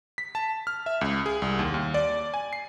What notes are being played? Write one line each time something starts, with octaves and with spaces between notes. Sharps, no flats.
B6
A5
F6
E5
C#2
G#4
C2
D#2
D#2
D5
G#5
C7